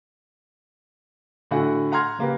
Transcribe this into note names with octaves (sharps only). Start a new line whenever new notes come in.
A2 D3 F#4 F#5 G#5
F#5 A#5 C6 F6 G#6
C#3 A#3 G4 B4